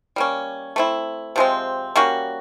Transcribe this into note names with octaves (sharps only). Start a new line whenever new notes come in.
G3 A#3 C#4
A3 C4 E4
C3 F3 G#3 C4
G3 A#3 C#4 F#4